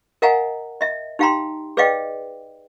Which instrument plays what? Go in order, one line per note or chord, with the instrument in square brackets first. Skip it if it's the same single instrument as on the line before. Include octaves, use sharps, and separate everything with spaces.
[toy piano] A#4 D#5 F5 F#5 G#5 A#5
D#5 E5
D#4 G4 F5 G5 A#5 C6
G#4 B4 D5 D#5 F5 G5